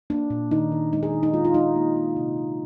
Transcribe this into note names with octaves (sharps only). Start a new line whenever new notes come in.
A#3 D4
A#2
D#3 D#4
D#3
G#3 D#4
G#4
D#3
D#4
G#3 F4
F4
G#3 D#4
A#3
A#3
C3
C3